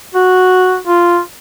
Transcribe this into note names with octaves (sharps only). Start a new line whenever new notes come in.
F#4
F4